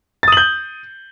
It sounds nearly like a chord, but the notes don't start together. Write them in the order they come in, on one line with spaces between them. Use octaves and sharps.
A6 D#6 F#7 G6